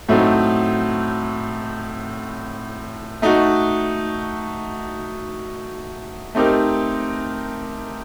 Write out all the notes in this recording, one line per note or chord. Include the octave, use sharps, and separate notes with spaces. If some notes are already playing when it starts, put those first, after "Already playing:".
A2 F#3 A3 C4 D#4
A3 D#4 F#4
A3 C4 D#4 G4 A#4